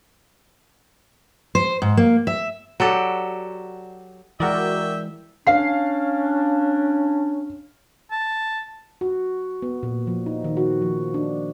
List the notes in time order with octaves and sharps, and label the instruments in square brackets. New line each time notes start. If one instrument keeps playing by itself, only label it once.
[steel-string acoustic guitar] C5
G#2
A#3
E5
[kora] F#3 D5 [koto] F#4 G4 A4
[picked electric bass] E3 G#3 [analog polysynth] F#4 A#4 D5 [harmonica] E5 G5
[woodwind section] C#4 D4 [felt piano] F5 C7
[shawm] A5
[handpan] F#4
B3
A#2
F3
D#4
D#3
F#4
F3
D4